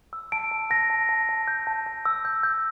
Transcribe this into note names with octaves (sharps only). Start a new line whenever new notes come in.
E6
A5 D7
A5
A5 A#6
A5
A5
A5
G6
A5
A5
E6
G6
G6